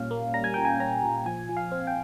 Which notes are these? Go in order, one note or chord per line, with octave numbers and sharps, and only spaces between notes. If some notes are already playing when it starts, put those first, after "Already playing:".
Already playing: A#2 G3 C#4 F5
A#3
G3 A#5
G#5
A#2 G5
G#5
C#4 A#5
A#2
F3 G#5
F3
F5
C4
G5